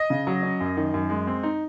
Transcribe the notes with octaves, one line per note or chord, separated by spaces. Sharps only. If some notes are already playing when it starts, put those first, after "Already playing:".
Already playing: D#5
C#3
F#3
C#4
F#2
D#3
F#2
G#3
C4
D#4